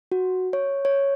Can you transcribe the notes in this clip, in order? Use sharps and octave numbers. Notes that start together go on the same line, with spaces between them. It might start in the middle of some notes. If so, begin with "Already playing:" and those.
F#4
C#5
C#5